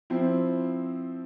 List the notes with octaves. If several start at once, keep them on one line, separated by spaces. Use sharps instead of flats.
F3 C4 E4